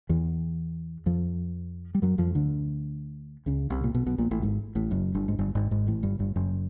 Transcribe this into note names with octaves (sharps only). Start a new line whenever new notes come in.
E2 E3
F2 F3
G3
F#2 F#3
F2 F3
D2 D3
C#2 C#3
C2 C3
A#2
B1 B2
B1 B2
A#1 A#2
A1 A2
G#1 G#2
A1 A2
F#1 F#2
G1 G2
G#2
G1 G2
G#1 G#2
G#1 G#2
A1 A2
G1 G2
G1 G2
F#1 F#2